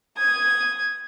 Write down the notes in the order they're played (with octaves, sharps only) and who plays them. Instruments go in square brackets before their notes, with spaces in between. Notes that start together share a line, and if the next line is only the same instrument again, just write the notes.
[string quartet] D#6 G#6